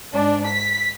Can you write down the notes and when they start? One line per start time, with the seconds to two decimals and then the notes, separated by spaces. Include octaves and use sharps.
0.12 G#2 D4
0.48 B6